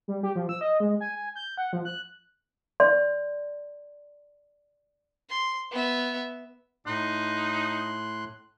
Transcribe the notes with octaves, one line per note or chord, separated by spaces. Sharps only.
G3
G4
F3
E6
D#5
G#3
G#5
G#5
G6
F#5
F3
F#6
D5 C6
C6
B3 E5
A2 D#4 C6 F#6